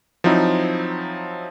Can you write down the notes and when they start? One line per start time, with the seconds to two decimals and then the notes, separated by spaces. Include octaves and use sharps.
0.24 F3 F#3 C4 D#4 E4